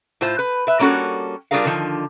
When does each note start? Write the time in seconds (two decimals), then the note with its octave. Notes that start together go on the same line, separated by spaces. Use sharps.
0.21 A2 F4 C5 A5
0.39 B4
0.67 B4 E5
0.79 G3 A#3 C#4 F#4 A4
1.51 G3 D4 F4 G#4 A#4 F5
1.65 D3 D#3 F3